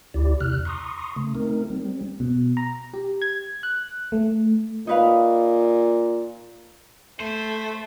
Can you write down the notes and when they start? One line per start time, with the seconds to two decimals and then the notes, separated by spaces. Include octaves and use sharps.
0.14 D2 E4 G4 D5
0.40 E2 C3 F6 F#6
0.65 A#5 C6 C#6 D#6
1.16 C#3 A3
1.35 A3 C4 D#4 A#4
1.70 G3 C4
2.20 B2
2.57 A#5
2.94 G4
3.22 G#6
3.63 F#6
4.12 A3
4.87 A#2 D#4 B4 F5
7.20 A3 C5